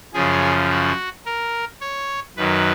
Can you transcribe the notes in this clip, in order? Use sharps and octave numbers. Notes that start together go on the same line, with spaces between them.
F#2 C#3 F3 G#4
F#4
A#4
C#5
F#2 D#3 F#3 B4